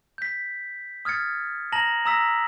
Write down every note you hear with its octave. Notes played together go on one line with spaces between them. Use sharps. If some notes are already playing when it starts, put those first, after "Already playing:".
G6 B6
D#6 F6 G#6 A6 C#7
A5 A#5 A#6 F#7
A#5 D#6 E6 A#6 B6